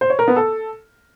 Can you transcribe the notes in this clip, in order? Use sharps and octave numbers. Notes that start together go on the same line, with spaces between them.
C5
C#5
A#4
B3
A4